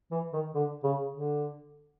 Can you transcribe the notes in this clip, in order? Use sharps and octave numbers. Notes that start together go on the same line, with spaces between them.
E3
D#3
D3
C#3
D3